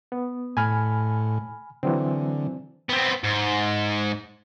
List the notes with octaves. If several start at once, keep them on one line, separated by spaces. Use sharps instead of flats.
B3
A2 G#5 B5 F6
D3 E3 F#3 C4
B3 C4
G#2